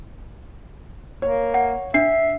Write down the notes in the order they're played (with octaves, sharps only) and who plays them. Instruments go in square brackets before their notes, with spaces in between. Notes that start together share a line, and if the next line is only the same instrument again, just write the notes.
[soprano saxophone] A#3 [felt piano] C#5
[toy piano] F#5
[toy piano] D4 [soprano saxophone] E5 [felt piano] C7